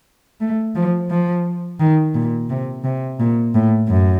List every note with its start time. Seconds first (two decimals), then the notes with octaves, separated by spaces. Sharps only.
0.41 A3
0.75 F3
1.10 F3
1.80 D#3
2.15 A#2
2.49 C3
2.84 C3
3.20 A#2
3.54 A2
3.88 F#2